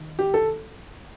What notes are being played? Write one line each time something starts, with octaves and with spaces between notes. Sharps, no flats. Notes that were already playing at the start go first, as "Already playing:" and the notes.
Already playing: D#3
G4
A4